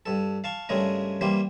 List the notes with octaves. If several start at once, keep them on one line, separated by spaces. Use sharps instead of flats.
G2 A4
F5 A5 C#6
G2 C#3 G#3 A3 A#4
E3 G3 A#3 C5